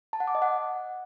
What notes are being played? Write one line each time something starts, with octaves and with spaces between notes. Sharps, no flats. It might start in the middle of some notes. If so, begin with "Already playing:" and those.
A5
F#5
D6
D#5
F#5